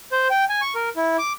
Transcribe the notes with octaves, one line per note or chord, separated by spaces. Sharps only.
C5
G5
G#5
C#6
A#4
E4
D6